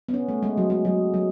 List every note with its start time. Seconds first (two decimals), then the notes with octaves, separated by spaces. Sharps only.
0.09 B3
0.14 C#4
0.28 A3
0.43 G#3
0.57 F#3
0.70 G#3
0.85 F#3
1.14 F#3